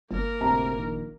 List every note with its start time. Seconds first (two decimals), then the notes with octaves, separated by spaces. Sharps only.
0.11 G1 A#3 A#4
0.41 D2 A2 C3 A#5
0.77 A#1 D#3